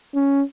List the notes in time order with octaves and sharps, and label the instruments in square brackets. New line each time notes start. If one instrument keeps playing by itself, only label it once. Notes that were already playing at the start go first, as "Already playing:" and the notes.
[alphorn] C#4